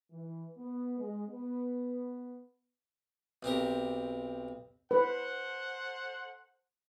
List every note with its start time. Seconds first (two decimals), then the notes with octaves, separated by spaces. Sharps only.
0.11 E3
0.56 B3
0.98 G#3
1.27 B3
3.43 B1 C4 G4 A#4
4.91 A4 B4 C5 F#5